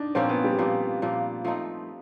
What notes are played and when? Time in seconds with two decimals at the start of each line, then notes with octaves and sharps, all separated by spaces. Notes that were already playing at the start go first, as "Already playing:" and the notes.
Already playing: D4 D#4
0.15 A#2 F3 A#3 C4 C#4
0.29 B3
0.44 G3
0.58 A#2 F3 A#3
1.02 A#2 F3 A#3
1.45 F3 A3 C4 D#4